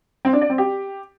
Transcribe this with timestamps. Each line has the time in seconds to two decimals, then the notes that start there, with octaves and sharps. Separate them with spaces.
0.25 C4
0.33 D4
0.41 D5
0.50 C4
0.58 G4